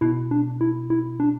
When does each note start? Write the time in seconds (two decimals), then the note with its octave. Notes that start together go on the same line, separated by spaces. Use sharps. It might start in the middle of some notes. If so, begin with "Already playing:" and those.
0.01 B2 E4
0.31 D4
0.61 E4
0.90 E4
1.20 D4